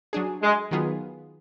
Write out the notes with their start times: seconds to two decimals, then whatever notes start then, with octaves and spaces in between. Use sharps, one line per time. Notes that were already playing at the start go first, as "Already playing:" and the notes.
0.13 F#3 D4 G#4
0.42 G#3
0.71 D#3 F#3 B3 F4 G#4